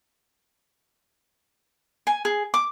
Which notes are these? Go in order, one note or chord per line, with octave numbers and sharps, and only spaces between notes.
G#5
G#4
D6